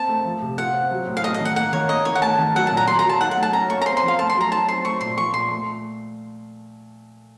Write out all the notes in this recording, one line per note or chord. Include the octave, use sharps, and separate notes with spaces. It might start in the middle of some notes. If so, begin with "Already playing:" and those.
Already playing: A#3 C4 A5
A3
F3
C3
F4 F#5
C4
F#3
A2
F5
A3 D#5
D#5
D#3
F#5
A#3 F#5
D#3 C#5
A#3 D#5
D#3 C#5
F#5
A3 A5
D#3
F#3 F#5
A#2 A5
A#5
A#3 C6
A#5
F#3
A5
D#4 F#5
F#5
A3
A5
C#4 A#5
A#3 C#6
A#5
C4 C6
C6
F3
F5
A3 A5
C6
F#3
A#5
D#4 A5
C4 C6
A3 C#6
A#2 C6
F3 C#6
A#2 C6
A3